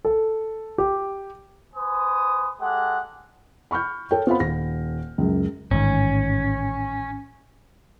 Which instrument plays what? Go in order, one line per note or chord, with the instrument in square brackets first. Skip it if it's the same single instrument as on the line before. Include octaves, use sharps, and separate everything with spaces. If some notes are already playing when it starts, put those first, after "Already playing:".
[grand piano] A4
G4
[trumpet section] B4 C5 G#5 D#6
G#3 G4 A4 F#5
[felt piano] B5 C#6 F6 G6
A4 C#5 G5
B3 C4 F4 C5 F5 B5
D#1 A#6
C#2 F#2
[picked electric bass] A1 G#2 D#3 [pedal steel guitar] C#4